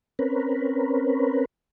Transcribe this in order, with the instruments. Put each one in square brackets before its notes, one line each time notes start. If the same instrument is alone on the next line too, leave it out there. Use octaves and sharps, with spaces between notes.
[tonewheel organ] C4 C#4 A#4 B4